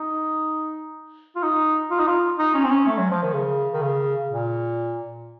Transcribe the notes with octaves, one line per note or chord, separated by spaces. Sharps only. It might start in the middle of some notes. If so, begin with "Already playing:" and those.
Already playing: D#4
F4
D#4
F4
D#4
F4
D#4
C#4
C4
C#4
A3
F#3
F3
D#3
C#3
D#3
C#3
A#2